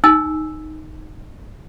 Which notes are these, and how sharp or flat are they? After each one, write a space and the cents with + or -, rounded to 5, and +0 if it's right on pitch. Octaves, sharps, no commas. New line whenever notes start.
D#4 +0 G#5 +5 E6 +0